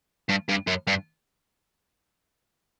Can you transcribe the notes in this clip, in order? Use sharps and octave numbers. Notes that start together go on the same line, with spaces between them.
G2
G2
F#2
G2